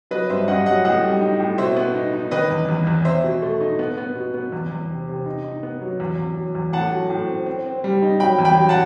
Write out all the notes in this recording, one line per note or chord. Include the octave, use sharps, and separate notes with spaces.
F#3 B4 D#5
G2 C5 E5
G2 D#5 F#5
F#3 D#5 F#5
A2 D#5 F#5
G3
D#4
A2
B2 C5 E5
B3
D#4
D#4
D#3 B4 D#5
E2
E2
E2
C4 C5 E5
B2
A3
D#4
B3
B3
B2
B3
E2
E2
C3
C3
D#4
D#4
B3
F#3
E2
E2
F#3
E2
A2 F#5 A5
F#3
A2
C4
C4
C4
G3
D#4
F#3 G5 B5
E2
G5 B5
F#3
F#5 A5